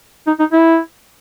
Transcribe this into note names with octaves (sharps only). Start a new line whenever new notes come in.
D#4
D#4
E4